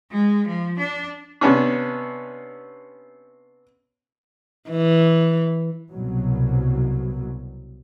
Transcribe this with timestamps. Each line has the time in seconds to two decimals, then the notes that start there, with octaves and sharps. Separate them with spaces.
0.11 G#3
0.47 F3
0.79 D4
1.41 C3 B3 C#4 D4
4.70 E3
5.90 C2 B2 F#3